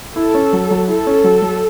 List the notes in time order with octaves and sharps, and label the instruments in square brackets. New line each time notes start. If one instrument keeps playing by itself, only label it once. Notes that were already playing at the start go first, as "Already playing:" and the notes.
[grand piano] E4 [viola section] A4
[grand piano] C#4
F#3
F#3
[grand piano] E4 [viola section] A4
[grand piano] C#4
F#3
F#3